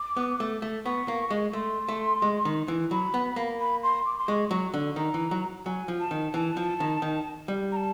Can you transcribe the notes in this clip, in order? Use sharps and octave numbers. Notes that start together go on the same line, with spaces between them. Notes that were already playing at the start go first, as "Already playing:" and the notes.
Already playing: D6
B3
A3
A3
B3 C#6
A#3
G#3
A3 C6
A3
G#3
D#3
E3
F#3 B5
B3
A#3
B5
C6
D6
C6
G#3 C#6
F#3 C#6
D3
D#3 A#5
E3
F#3
F#3 G#5
F3
A5
D#3
E3 A5
F3
D#3
D#3
G3
A#5
A5